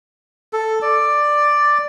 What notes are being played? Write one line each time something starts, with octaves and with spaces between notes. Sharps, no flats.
A4
D5